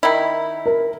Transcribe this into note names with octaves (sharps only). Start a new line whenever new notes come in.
D#3 E4
A#4